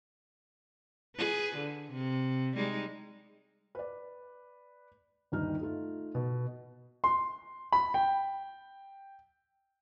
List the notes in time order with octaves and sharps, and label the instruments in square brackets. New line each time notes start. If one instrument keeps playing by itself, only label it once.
[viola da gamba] G#4 B4
D3
C3
G3 G#3 D#4
[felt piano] B4 D5
G1 D#2 G3 D#4 F6
A3 D#4 F4
B2
[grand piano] C6
B5
G5